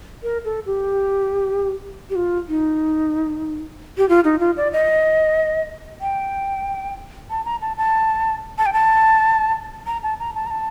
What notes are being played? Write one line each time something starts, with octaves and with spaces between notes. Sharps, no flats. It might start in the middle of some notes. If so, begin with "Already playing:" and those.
A#4
A4
G4
G4
F4
D#4
G4
F4
D#4
F4
D5
D#5
G5
A5
A#5
A5
A5
A5
G5
A5
A#5
A5
A#5
A5
A#5
A5